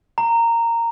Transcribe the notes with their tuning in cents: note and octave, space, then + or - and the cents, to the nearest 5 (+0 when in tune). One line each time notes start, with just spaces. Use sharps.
A#5 -10